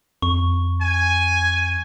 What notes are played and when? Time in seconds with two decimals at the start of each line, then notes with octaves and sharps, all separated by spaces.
0.22 F2 C#6
0.81 G#5